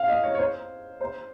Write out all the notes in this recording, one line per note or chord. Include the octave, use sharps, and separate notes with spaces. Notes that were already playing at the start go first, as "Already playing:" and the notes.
Already playing: F5
D#5
C#5
C#5
C5
C5